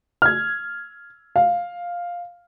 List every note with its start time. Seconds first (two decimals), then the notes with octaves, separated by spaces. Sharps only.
0.22 F6 G#6
1.36 F5